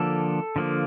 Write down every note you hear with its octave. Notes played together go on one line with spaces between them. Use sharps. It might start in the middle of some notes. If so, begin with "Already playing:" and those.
Already playing: D3 F3 A#3 A4
D3 F3 A#3